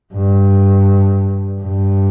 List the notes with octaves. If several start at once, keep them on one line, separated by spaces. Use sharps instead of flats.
G2
G2